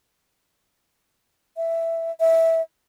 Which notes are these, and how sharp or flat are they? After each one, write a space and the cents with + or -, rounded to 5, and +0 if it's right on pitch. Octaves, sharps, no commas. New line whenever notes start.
E5 +5
E5 -10